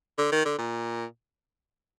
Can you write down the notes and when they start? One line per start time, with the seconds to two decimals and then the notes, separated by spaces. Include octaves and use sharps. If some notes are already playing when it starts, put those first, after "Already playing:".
0.18 D3
0.32 D#3
0.45 D3
0.59 A#2